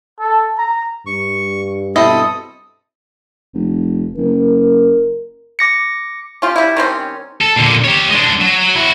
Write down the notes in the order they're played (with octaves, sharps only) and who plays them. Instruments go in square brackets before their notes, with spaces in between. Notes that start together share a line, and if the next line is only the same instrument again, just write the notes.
[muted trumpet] A4
A#5
[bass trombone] G2 [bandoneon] C#6
[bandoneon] B2 A4 D#6 [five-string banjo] C4 E4 D#5
[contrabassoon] F1
[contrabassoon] F#1 [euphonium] A#4
[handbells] D6 A#6 C#7
[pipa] C#4 F4 G4
G3 E4
D#3 G3 C4 C#4
[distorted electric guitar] A4
A#2 D3
G4 C#5
G#3 D4
F#3
E4 F#4